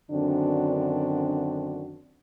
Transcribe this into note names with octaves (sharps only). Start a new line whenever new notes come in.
F#2 D3 D#3 C4 D4 F#4